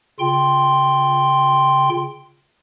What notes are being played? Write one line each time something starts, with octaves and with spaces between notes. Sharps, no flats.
C#3 F4 G5 C6